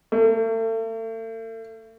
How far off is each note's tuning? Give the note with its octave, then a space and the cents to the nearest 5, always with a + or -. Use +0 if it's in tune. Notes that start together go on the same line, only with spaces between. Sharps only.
A3 +40